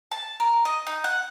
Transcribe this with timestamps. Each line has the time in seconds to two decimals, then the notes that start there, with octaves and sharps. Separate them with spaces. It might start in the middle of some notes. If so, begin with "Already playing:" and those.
0.11 A5
0.40 A#4
0.65 D#5
0.87 D#4
1.04 F#5